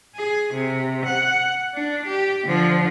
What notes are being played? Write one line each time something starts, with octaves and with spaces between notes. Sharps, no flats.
G#4
C3
F#5
D4
G4
D3 F3